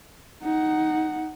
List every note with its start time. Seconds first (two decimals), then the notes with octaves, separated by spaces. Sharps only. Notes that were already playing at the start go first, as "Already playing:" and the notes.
0.42 D#4 F#5